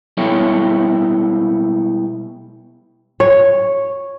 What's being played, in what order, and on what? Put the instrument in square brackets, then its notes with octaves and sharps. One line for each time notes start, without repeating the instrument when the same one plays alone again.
[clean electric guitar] B2 G3 G#3 E4 G4 C#5
[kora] C#5